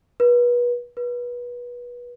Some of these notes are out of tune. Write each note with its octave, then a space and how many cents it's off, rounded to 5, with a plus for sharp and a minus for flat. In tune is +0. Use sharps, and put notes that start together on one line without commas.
B4 -30
B4 -25